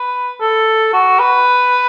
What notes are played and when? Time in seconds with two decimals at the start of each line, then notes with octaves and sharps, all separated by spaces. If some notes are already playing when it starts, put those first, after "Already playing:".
Already playing: B4
0.41 A4
0.93 F#4
1.20 B4